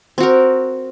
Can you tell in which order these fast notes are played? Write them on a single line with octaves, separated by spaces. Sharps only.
C4 F#4 A#4